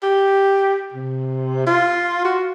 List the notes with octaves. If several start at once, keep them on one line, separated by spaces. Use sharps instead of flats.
G4
C3
F4
F#4